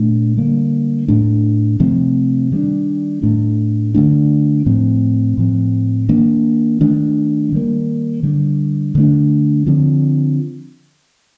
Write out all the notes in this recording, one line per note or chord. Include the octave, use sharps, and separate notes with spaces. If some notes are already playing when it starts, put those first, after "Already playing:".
Already playing: A#2 A3 D4
D3 G3 A#3
A2 A3 D4
C3 F3 A3 C4
D#3 G3 A#3 D4
A2 A3 D4
D3 A3 D4
A2 F3 A3 C4
A2 F3 C4
D#3 A#3 D4
D#3 A3 D4
D#3 G3 A#3
D3 G3 D4
D3 A3 D4
D3 F3 C4